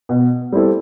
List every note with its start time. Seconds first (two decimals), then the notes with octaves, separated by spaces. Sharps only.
0.09 B2
0.52 G3 C4 E4 A4